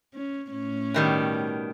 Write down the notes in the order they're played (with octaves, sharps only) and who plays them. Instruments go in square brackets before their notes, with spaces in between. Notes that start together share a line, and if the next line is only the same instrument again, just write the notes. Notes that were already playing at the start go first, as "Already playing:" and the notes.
[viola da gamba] C#4
A2 C#4
[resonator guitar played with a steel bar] B2 D#3 G3